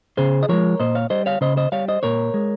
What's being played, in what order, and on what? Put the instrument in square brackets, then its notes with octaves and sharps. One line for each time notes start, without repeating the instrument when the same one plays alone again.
[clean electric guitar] C#3 G#4 C5
D#5
F3 G#3 A#4 C#5
A#2 C5 D#5
C#5 F5
G3 C5 D#5
C#5 F5
C#3 C5 D#5
C5 D#5
G3 C#5 F5
C5 D#5
A#2 A#4 C#5
G#3